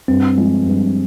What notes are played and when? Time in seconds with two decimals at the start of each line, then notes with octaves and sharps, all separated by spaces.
0.08 G2 C4
0.37 F3 G#3
0.66 G2